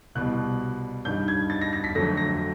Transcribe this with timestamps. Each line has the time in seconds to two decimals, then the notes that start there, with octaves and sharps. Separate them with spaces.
0.15 C2 B2 G3 F#6
1.05 G2 D#3 G3 G6
1.28 G#6
1.50 A6
1.61 A#6
1.73 A#6
1.84 B6
1.95 F2 D3 F#3 A3 A#6
2.17 A#6